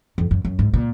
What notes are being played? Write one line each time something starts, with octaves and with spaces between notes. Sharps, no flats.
F2
F#2
F#2
G#2
A#2